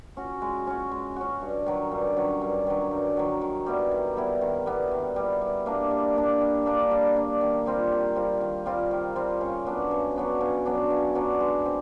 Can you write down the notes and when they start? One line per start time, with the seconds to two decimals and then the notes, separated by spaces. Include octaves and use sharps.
0.17 C#4 F#4
0.42 G#3
0.67 C#4 F#4
0.91 G#3
1.16 C#4 F#4
1.42 G2
1.66 D#3 F#3
1.92 G2
2.17 D#3 F#3
2.41 G2
2.67 D#3 F#3
2.91 G2
3.17 D#3 F#3
3.41 D#3
3.66 G3 B3 E4
3.91 D#3
4.17 G3 B3 E4
4.41 D#3
4.66 G3 B3 E4
4.91 D#3
5.16 G3 B3 E4
5.41 G3
5.66 A#3 D4
5.91 G3
6.16 A#3 D4
6.41 G3
6.66 A#3 D4
6.91 G3
7.16 A#3 D4
7.41 D#3
7.66 G3 C4 F4
7.91 D#3
8.16 G3 C4 F4
8.41 D#3
8.66 G3 C4 F4
8.91 D#3
9.16 G3 C4 F4
9.41 C#3
9.66 F#3 B3 D4
9.91 C#3
10.16 F#3 B3 D4
10.41 C#3
10.66 F#3 B3 D4
10.90 C#3
11.15 F#3 B3 D4
11.40 G#3
11.66 C4